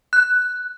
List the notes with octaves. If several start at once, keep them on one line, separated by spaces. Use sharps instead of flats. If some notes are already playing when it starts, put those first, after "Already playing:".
F#6